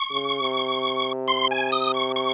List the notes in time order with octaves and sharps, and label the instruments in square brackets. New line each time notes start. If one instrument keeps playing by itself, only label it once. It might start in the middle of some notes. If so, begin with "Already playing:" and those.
Already playing: [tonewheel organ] C#6
[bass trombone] C#3
C3
[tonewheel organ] C6
G#5
D#6
C#6
C#6